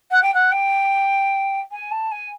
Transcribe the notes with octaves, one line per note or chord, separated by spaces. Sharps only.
F#5
G5
F#5
G5
G#5
A5
G#5